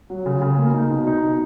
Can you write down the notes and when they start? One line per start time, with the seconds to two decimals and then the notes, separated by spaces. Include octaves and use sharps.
0.10 F#3
0.26 C#3
0.42 C#3
0.58 A#3
0.74 D#4
0.90 B2
1.07 D#4
1.23 B2